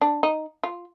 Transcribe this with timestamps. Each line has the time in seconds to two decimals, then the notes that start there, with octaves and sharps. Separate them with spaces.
0.01 D4
0.23 D#4
0.63 F4